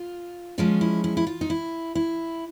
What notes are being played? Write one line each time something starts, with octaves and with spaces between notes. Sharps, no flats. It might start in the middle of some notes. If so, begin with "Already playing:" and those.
Already playing: F4
F3 G#3 C#4 F4
E4
E4
E4
F4
D#4
E4
E4